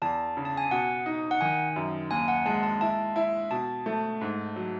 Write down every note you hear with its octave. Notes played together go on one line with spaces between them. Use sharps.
E2 A5
C#3
A5
G#5
B2 F#5
D#4
F#5
D#3 G#5
F#2
D#2 G#5
F#5
G#3 A5
A5
E4 A5
E4
B2 A5
A3
G#2
F#3